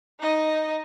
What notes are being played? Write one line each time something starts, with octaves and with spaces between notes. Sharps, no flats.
D#4 D#5